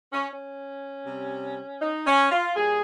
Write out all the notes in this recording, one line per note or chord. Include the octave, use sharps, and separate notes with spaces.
C#4
C#4
C3 G3
D#4
C#4
F4
A#2 G3 G#4